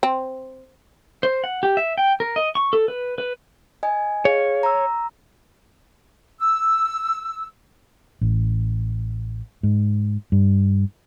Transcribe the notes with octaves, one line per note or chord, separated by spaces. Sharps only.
C4
C5
F#5
G4
E5
G5
A#4
D#5
C#6
A4
B4
B4
D#5 G#5
G#4 C#5 F5
A#5 E6
E6
A1
G#2
G2